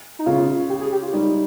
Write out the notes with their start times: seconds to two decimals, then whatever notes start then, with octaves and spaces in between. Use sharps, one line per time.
0.19 D#4
0.26 C#3 F4
0.70 G4
0.81 G#4
0.92 G4
1.03 F4
1.13 G3 D#4